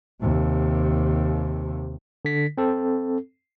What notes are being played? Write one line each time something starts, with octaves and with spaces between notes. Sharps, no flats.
D#2 C3
D3 B6
C4 A4